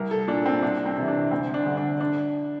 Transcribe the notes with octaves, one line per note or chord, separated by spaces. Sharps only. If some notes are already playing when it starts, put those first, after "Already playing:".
Already playing: C2 A#4
A4
A#2 D4
C4
C2 D4
C4
C3 E3
D4
D2 C4
D4
D3
D4
D4